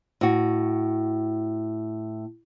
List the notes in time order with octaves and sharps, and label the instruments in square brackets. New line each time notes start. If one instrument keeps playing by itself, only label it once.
[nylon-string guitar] A2 F#4